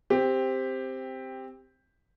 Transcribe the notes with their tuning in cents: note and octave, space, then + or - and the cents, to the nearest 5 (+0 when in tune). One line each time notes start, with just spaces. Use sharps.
C4 +0 G4 +10